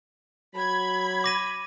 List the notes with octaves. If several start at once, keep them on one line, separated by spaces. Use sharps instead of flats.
F#3 B5 G#6
D6 A#6 D#7